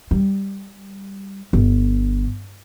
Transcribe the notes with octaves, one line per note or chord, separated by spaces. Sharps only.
G3
G1